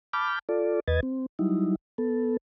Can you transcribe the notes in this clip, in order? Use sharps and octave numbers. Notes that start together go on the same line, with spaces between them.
A5 B5 D6 F6 G6
F4 A4 D5
E2 B4 D#5 G#6 A6
C4
F#3 G3 D#4 E4
B3 A4